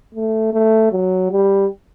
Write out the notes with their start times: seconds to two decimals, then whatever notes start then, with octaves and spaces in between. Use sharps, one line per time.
0.15 A3
0.53 A3
0.92 F#3
1.31 G3